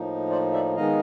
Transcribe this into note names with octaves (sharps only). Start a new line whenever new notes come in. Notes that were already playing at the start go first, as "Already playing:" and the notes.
Already playing: A2 F3 A#3 D#4
C5 D5
D5 E5
D#3 G#3 B3 D#4 D#5 F5